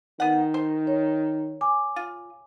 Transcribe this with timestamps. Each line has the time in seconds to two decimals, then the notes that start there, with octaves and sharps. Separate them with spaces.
0.20 D#3 B3 F#5
0.54 C5
0.87 C#5
1.61 G#5 D6
1.96 F4